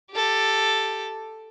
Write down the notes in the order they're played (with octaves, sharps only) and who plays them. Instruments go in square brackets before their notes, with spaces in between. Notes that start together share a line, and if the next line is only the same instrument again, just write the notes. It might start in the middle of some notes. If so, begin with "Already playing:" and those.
[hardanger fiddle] G4 A4